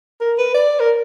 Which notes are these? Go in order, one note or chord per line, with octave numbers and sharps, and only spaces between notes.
A#4
B4
D5
A#4